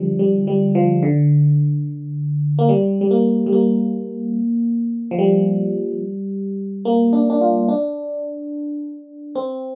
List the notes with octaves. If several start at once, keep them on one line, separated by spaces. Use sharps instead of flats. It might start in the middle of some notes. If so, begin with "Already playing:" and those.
Already playing: D3 F3 G3
G3
G3
F3
D3
A#3
G3
G3
A#3
G3
A#3
F3
G3
A#3
D4
D4
F4
D4
C4